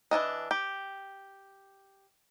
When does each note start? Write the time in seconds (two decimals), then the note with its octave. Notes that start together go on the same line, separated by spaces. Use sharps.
0.11 E3 F#3 D4 D#5
0.51 G4